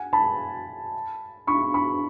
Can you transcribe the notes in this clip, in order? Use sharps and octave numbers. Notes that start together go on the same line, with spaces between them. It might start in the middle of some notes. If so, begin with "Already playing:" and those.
Already playing: F#5 G#5
A5 B5
B5 C#6
B5 C#6